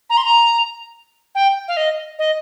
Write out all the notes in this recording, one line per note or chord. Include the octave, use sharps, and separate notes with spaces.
A#5
C6
A#5
G5
F5
D#5
D#5